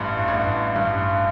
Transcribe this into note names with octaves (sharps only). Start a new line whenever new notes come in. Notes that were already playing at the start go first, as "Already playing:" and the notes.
Already playing: A1 G2
A1
G2